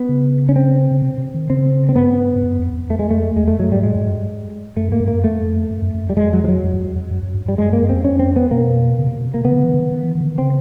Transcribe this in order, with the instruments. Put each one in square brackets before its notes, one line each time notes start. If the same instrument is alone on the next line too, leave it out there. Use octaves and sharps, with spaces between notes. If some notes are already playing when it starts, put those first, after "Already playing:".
Already playing: [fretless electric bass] B3
[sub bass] C#3
[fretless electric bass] C#4
C4
[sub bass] C#3
C3
C3
D#3
[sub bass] C#3 [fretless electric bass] C4
[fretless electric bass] C4
[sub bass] G2 [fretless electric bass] B3
[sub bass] G2
F#2
F2
F2
[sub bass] F2 [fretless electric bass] A3
[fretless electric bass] G#3
A3
[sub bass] E2 [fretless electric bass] G#3
[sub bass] F2 [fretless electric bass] A3
[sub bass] F#2 [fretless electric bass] F#3
[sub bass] G#2 [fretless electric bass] G3
[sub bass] A2 [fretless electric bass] G#3
[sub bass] G2
G2
[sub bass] F#2 [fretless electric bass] A3
[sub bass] G#2 [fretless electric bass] A#3
[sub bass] G2
[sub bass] F#2 [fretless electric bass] A#3
[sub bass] F2 [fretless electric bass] A3
[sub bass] F#2
F#2
F#2
F2
[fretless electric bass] G3
[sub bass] F2 [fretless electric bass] G#3
[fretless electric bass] F#3
F3
F#3
[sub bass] F2
F#2
F2
F2
F#2
F#2
G2
[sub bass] G2 [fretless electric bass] G3
[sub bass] F#2 [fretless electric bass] G#3
[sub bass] G2 [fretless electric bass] A#3
[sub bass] F#2
[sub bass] F2 [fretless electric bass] C4
[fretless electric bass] C#4
C4
B3
[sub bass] B2 [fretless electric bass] A#3
[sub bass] C#3
C3
B2
C3
[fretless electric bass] A#3
[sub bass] C#3 [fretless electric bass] B3
[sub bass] D#3
D3
E3
D#3
D3
D#3
D#3
E3
D#3
D3
D#3
[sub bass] C#3 [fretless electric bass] C4